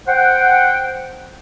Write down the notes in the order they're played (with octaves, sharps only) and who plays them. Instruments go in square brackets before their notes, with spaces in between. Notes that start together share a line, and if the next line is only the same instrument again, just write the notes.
[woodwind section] C5 F#5 G5